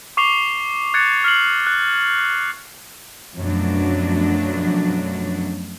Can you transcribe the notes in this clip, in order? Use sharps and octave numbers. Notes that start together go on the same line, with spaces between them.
C#6 D6 C7 F7 G7
F#6 G#6 A6 C#7
F6 C7 F#7
F#6
F#2 B2 F3 F#3 A3 D4